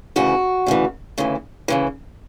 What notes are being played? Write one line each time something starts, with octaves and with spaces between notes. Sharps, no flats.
D2 C#3 E3 F#4
D2 C#3 E3
D2 C#3 E3
D2 C#3 E3